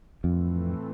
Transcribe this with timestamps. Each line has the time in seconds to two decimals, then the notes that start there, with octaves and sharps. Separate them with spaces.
0.24 F2 A2 E3 A3 C4